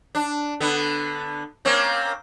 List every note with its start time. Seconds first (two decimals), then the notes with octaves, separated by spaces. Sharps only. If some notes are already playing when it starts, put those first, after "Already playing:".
0.15 D4
0.60 D3 B3
1.65 A#3 C4 C#4